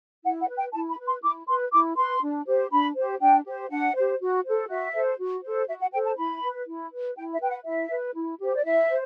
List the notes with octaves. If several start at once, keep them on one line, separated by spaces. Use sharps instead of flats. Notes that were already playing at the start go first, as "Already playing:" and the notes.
E4 F#5
F#5
B4
G5
E4 A5
B5
B4
C6
E4 D6
B4 C6
E4 D6
B4 C6
D4
G4 C5
D4 B5
G4 C5
D4 G5
G4 C5
D4 F#5
G4 C5
F#4
A4 C5
F#4 E5
A4 C5
F#4
A4 C5
F#4 E5
F#5
A4 C5 G5
A5
E4 B5
B4
E4
B4
E4 G5
E5
B4 G5
F#5
E4 E5
B4
E4
G4 C5
D5
E4 E5
C5